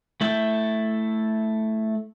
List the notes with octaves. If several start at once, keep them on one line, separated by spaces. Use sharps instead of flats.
A3 E4 A4 E5 G5